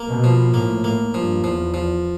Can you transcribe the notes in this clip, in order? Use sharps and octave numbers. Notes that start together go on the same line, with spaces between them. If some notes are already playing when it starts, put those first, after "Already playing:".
Already playing: A#3
B2
F3
A2 A#3
A2 A#3
G2 F3
E2 F3
F3